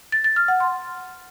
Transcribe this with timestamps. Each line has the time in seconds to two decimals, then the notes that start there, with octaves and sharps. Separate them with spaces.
0.12 A6
0.24 A6
0.36 F6
0.48 F#5
0.60 C6